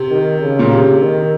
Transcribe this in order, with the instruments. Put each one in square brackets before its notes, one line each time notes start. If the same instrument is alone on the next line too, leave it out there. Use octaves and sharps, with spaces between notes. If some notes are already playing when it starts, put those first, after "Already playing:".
Already playing: [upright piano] C3
[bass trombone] D#3
C#3
[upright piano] A#2
C3
[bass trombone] D#3